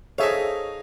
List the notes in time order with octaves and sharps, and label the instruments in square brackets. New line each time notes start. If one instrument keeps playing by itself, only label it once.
[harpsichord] D#4 G#4 F5 [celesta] A4 C5 A5 [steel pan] C#5 E5